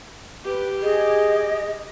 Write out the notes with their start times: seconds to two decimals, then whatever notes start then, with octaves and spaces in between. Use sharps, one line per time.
0.46 G4 B4
0.82 G#4 D#5